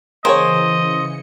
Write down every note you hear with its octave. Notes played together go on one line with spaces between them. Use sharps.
C#3 E3 A#3 G#4 C5 C#5 D#5 C#7